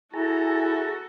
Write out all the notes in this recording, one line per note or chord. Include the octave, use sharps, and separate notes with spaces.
E4 F#4 G#4 A4 A5 A#5